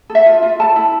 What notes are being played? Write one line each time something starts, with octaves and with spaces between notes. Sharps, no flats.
A4
E5
F4
F4
A4 A5
E4